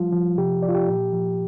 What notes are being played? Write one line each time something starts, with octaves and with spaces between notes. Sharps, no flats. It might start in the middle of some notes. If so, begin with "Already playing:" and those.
Already playing: F3 G3 F4
F3
C3 G4
F3 D5
F4
G4
A#2
F3